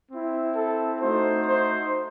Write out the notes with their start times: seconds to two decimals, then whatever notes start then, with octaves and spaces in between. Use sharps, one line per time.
0.10 C4 E4
0.56 A4
1.01 A3 D#4 F#4 C5
1.47 C5